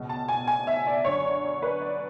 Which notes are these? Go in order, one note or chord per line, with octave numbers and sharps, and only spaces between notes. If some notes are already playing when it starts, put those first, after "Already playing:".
Already playing: C#2 B2
A5
G#5
G#5
E5
D5
F#2 D3 C#5
B4
D5